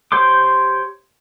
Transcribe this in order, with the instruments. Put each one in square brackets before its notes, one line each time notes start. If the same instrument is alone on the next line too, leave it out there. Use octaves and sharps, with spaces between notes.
[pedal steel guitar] G4 C5 C#5 C6 D6